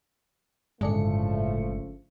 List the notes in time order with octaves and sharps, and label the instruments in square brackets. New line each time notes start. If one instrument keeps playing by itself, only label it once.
[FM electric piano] G1 D4 C#7 [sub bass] A2 [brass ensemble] C#3 F3 A3 [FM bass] G#3